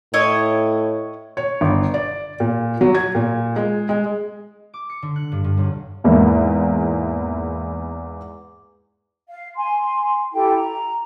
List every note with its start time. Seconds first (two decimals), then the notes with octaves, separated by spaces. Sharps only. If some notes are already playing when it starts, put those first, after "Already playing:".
0.14 A2 E4 C#5 D#5
1.37 C#5
1.61 G1
1.94 D5
2.40 A#2
2.81 F#3
2.95 G#6
3.15 A#2
3.56 G#3
3.89 G#3
4.74 D6
4.90 C#7
5.02 D3
5.16 F#6
5.32 G2
5.44 G2
5.57 B1
6.04 E2 G#2 A#3 E4
9.27 F5
9.56 G#5 C6
10.33 E4 G4 A4 G5
10.56 A#5